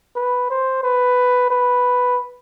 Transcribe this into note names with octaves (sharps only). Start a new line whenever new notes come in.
B4
C5
B4
B4